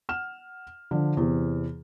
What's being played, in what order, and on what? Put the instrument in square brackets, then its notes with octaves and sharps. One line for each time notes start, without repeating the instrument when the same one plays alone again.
[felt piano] F#5 F6 E7
D3 F3
E2 C3